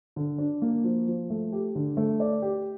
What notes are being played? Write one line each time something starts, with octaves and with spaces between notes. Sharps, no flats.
D3
D4
A#3
F3
F3
A3
G4
D3
A3
D5
G4